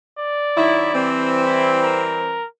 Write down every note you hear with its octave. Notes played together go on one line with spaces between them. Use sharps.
D5
D#3 F#3 E4
E3 G3 C4
E4
A#4